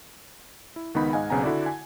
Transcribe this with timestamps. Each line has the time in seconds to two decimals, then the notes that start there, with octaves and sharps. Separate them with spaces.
0.76 E4
0.94 C#2 D#3 B3 D#4 B5
1.13 G#2 D#5 F5 F#5 G#5
1.30 B1 C#3 B3 C4 G#5 A#5
1.43 D3 E4 F#4 D5
1.66 G#5